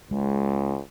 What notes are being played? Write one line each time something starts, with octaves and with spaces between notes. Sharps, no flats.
C#2 G#3